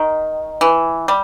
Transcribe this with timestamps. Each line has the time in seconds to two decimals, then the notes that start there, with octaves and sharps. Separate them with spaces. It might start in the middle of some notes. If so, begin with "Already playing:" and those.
Already playing: D#3
0.61 E3
1.08 G3